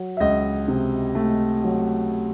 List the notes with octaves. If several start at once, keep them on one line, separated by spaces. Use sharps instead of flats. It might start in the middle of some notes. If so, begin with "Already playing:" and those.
Already playing: F#3
E5
C#2 D#5
C3
A3
F#3